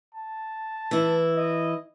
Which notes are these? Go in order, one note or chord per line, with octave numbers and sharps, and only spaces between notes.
A5
E3 E4
D#5